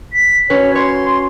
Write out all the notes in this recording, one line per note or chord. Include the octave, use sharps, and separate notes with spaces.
B6
C#4 F#4 B4 C#5
C#5 C6